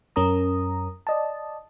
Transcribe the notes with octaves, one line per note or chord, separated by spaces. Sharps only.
F#2 C#4 A#4 A#5 D#6
D5 D#5 A5